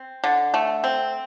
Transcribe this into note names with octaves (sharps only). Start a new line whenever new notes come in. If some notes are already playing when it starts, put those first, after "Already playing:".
Already playing: C4
D3
A3
C4